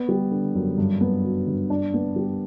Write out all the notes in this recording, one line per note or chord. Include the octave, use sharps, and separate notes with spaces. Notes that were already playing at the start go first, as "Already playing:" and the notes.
Already playing: B3
G3
D3
F#2
G2
B3
F#3
G2
D4
B3
G3